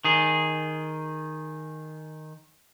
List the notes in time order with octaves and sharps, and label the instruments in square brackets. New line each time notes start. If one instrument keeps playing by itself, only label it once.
[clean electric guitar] D#3 G#4